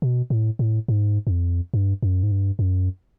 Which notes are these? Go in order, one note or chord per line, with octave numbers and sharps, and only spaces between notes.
B2
A2
A2
G#2
F#2
F2
G2
F#2
G#2
G2
F#2